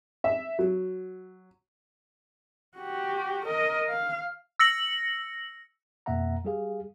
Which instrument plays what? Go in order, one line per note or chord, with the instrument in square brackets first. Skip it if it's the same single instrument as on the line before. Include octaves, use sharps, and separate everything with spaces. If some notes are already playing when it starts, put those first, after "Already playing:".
[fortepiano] E5
F#3
[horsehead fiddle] F#4 G4
A#4 D#5
F5
[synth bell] E6 A#6 C#7 F#7
[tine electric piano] F2 B2 A#3 E5 F#5 A#5
G3 G4 G#4 F5